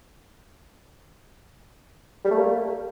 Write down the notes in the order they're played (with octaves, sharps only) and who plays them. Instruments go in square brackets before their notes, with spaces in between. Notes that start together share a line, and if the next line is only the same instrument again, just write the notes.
[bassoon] G3
A3
A#3